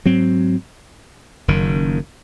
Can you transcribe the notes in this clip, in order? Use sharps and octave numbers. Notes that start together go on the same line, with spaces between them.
G#2 F#3 C4
F#1 F#2 D#3